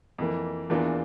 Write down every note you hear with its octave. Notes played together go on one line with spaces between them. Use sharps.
F2 E3 A#3
E2 E3 A#3 D4 F4